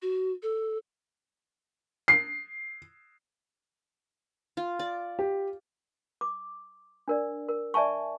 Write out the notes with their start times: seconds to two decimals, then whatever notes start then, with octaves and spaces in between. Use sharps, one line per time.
0.02 F#4
0.43 A4
2.08 C7
4.57 F4
4.79 D5
5.19 G4
6.21 D6
7.08 D4 A#4 D5
7.48 A#4
7.74 D5 E5 G#5 A5 C#6